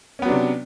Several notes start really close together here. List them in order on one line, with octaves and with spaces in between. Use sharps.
C#4 B3 F#3 D4 C3